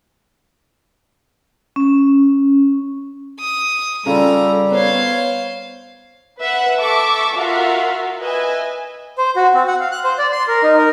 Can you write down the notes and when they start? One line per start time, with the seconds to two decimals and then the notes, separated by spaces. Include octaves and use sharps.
1.76 C#4
3.40 D#6
4.06 C#3 G3 C#4 F4 A4 A#5
4.72 B3 C5 C#5 F5
6.41 B4 E5 F#5
6.80 A4 E5 C#6 D6 E6
7.36 F4 F#4 A#4 E5 F5
8.21 B4 D#5 E5 G#5
9.18 C5
9.36 F#4
9.54 C4
9.67 F#5
9.80 F5
9.91 F#6
10.04 C5
10.18 D5
10.32 C6
10.48 A#4
10.63 D#4
10.78 A#4